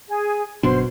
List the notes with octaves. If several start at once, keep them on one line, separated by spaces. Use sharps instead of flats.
G#4
G1 B2 F#3 D4 C5 C6